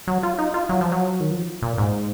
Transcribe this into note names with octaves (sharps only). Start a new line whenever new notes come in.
F#3
F4
D#4
F4
F#3
F3
F#3
D#3
F3
A#2
G#2